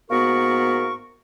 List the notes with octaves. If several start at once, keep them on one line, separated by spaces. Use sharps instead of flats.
G#2 A#3 B3 F#4 A#4 C#6